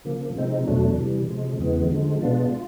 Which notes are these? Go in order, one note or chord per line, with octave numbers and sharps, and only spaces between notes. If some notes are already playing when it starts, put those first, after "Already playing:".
C#3 F3 A#3
C3 F3 G#3 C4 D#4
E2 B2 F#3 A3 D4
C3 E3 G3
C3 F3 G#3
E2 C#3 E3 G#3 B3
D3 F3 G#3
B2 G#3 B3 D4 F4
F4